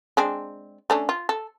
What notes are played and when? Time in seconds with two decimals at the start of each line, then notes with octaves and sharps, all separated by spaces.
0.17 G#3 C4 D4
0.90 A3 C#4 D4
1.09 F4
1.29 A4